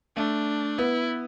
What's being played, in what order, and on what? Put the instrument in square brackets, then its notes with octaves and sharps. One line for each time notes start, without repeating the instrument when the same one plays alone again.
[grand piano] A3 [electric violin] D4
[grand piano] B3 [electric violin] E4